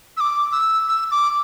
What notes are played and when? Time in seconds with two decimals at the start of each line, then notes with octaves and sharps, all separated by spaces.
0.17 E6
0.20 D6
0.52 E6
0.88 E6
1.11 D6